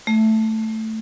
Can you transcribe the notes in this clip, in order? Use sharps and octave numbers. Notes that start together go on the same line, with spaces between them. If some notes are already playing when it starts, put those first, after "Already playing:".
A3